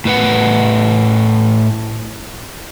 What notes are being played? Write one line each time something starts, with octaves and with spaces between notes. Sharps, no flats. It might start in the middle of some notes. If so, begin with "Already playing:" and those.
A2 B4 F#5